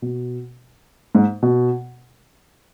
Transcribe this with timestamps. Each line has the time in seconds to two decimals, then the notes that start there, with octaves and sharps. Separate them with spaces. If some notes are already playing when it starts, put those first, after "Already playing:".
0.02 B2
1.15 G#2
1.43 B2